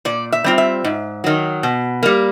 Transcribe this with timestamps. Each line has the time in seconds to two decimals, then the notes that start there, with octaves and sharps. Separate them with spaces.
0.05 A#2 D5
0.32 E5
0.44 G3 C4 F4
0.58 E5
0.84 G#2
1.24 D#3 F#3
1.63 B2
2.03 G3 A#3